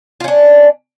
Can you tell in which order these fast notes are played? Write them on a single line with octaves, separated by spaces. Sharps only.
F4 C#4 D4